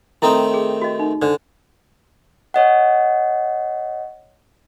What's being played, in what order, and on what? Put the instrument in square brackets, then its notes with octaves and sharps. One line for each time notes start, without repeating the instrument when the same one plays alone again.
[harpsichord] D#3 A3 C4 [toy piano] E4 D#6
[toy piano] G#4
F#4 D#5
D#4
[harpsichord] D3 [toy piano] D4 C5 D5
[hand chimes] C#5 D#5 F#5